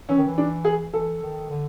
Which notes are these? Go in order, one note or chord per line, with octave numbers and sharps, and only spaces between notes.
E3 C#4
D#3
E3
D4
G#4
E3 A4
D#3
D3